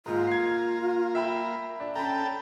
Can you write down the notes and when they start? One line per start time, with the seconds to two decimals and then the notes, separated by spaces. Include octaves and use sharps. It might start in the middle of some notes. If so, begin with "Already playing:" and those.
0.06 G#2 G#3 A#3 F4
0.27 G#6 C7
1.15 E5 G5 B5
1.80 D4
1.95 C#4 A4 G5 A#5 B5